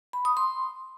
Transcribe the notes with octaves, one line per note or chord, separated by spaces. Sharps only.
B5
D#6
C6